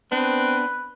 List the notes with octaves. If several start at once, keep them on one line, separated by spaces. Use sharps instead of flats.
B3 C4 D4 B4